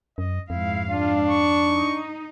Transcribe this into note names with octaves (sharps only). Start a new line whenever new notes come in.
F#2 D#5
F2 G#2 E4 F5
D4 F4
C#6
D#4